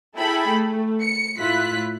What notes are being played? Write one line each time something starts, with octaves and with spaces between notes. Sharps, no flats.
E4 G#4 A4 G5 B5
A3
C#7
A2 E4 F4 F#6 B6